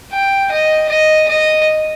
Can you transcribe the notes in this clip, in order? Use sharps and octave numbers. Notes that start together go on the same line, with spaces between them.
G5
D#5
D#5
D#5